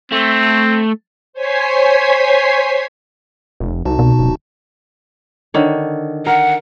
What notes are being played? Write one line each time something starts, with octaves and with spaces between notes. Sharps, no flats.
A3 C4
C5 C#5 G#5 G#6 B6 C7
F1
C2 D#4 F#4 A5
B2
D1
D3 D#3 C#5
A#4 F#5